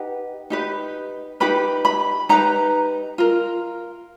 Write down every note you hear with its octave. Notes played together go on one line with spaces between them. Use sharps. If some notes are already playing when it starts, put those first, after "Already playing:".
Already playing: D#4 G4 B4 F#5
D#4 G4 B4
D#4 G4 B4 B5
B5
D#4 G4 B4 A#5
F4 A#4